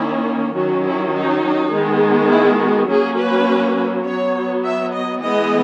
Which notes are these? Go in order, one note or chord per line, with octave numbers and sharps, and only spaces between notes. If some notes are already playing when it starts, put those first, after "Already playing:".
Already playing: D#3 A#3 C#4 E4
D#3 F#3 C#4 F#4
E4
D#4
D#3 G#3 B3
E4
F#4
F#3 A#3 C#4 G#4
B4
F#3 B3 C#5
E5
D#5
E3 G#3 B3 D#5